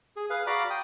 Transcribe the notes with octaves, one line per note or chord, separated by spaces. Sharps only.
G#4
G#4 B4 F5
F#4 D5 F5 A#5 B5 D6
G5 D#6